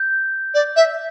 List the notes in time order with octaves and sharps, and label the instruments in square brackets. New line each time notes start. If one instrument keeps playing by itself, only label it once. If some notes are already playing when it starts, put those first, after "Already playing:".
Already playing: [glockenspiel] G6
[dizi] D5
E5